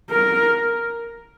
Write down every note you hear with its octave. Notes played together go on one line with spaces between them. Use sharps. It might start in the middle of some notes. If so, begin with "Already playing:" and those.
A#4